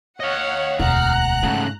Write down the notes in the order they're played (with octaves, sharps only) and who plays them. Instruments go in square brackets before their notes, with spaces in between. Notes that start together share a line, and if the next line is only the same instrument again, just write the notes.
[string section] C#5 F#5 [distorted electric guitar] D#5 F5
[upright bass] E1 D2 [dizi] F#5 [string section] A#5 F#6
[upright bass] G#2 [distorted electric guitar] C#3 A3